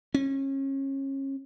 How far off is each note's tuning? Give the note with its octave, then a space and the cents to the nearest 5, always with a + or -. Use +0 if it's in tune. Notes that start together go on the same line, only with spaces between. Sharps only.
C#4 -30